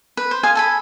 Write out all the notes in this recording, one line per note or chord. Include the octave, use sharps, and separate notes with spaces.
B4
C5
G#4 F5 G#5
A4 G#5 B5